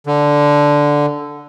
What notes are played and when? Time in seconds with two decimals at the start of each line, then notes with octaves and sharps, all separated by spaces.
0.06 D3